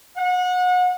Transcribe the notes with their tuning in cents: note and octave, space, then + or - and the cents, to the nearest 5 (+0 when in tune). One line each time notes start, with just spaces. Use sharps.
F#5 -30